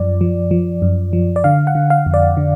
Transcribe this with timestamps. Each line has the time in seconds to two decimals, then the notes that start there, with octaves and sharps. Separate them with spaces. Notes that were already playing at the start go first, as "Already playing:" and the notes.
Already playing: F#2 F3 D5
0.21 F3
0.51 F3
0.82 F#2
1.13 F3
1.36 D5
1.44 D3 F5
1.67 F#5
1.75 D3
1.90 F5
2.06 F2
2.14 D5
2.37 D3